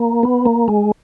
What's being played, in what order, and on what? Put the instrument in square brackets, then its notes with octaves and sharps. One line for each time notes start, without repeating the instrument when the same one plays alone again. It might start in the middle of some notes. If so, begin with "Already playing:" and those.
Already playing: [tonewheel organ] A#3
B3
A#3
G#3